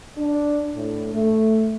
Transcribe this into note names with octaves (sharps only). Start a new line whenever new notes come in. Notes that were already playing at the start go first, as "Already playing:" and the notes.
D4
A2
A3